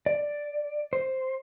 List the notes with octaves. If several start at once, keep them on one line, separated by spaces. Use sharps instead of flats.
D5
C5